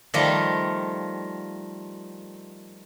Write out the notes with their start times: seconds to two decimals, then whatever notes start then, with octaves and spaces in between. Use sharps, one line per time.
0.14 D#3 F3 G3 A3 F4